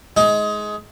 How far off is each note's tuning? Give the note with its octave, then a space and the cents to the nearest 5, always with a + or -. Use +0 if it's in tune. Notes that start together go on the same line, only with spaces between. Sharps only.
G#3 +20 D#4 +20